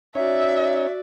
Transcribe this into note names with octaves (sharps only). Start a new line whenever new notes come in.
C#4 D#4 F#4 C#5 D5 E5